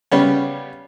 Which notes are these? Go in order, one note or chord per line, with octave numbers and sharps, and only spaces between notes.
C#3 G3 B3 C#4